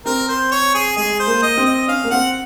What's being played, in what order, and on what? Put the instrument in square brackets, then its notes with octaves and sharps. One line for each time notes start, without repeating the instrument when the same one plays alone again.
[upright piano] C4 [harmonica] A#4
[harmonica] C5
C#5
G#4
[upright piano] G#3 [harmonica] G#4
[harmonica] C5
[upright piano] A#3
[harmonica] D#5
[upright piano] C4
[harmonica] D#5
[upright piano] C#4 [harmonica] F5
[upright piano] A#3
[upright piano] C4 [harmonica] F#5